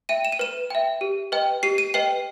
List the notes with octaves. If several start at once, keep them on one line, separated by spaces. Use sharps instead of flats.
E5 G5 D#7
E7
D#7
B4 E7
E5 G5
G4
B4 D#5 G5
G4 C7
D#7
B4 D#5 G5 C7